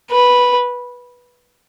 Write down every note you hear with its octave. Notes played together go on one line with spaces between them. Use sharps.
B4